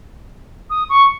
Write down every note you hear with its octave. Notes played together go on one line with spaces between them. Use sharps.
D#6
C#6